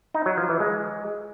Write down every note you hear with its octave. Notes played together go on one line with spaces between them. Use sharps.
D#4
F#3
F3
E3
G#3